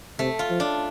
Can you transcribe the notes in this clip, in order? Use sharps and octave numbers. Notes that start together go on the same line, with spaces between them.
C3 A3
F4
F3
D4